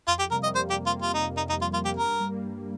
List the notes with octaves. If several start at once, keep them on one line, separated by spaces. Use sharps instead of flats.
F2 F4
G4
C3 G3 A#3 A#4
D#5
F2 C5
G4
C3 G3 A#3
F4
F2 F4
D#4
C3 G3 A#3
D#4
F2 D#4
F4
C3 G3 A#3 F4
G4
G2 A#4
G3 A#3
G2